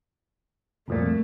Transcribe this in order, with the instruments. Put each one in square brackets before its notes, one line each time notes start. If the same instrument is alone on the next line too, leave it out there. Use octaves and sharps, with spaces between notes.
[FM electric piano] C2 F2 A#2 [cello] A3